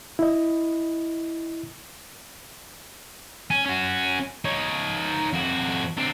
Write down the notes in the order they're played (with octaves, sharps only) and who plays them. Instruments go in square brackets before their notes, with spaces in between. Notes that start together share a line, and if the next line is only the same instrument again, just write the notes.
[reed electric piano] E4 D#5
[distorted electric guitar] C#4
C#4 F#4
D#4 C#5
F2 F#4
D3 C4